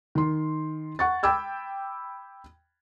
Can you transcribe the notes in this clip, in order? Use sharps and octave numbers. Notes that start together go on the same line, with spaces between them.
D#3 C6
F#5 C#6 A6
G5 B5 D6 E6 G#6